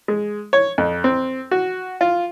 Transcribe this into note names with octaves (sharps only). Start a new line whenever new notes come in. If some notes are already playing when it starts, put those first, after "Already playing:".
G#3
C#5
F2
C4
F#4
F4